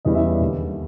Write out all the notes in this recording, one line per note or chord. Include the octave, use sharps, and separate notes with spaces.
E2 C#3 E3 G3 D#5
E5
D5
D#2 D3 G3